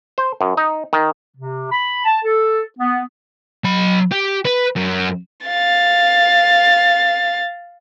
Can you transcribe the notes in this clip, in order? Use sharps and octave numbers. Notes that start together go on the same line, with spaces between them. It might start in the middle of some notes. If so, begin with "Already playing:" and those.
C5
F#2
D#4
D#3
C3
B5
A5
A4
B3
F#3 B5
G4
B4
F#2
F5 A6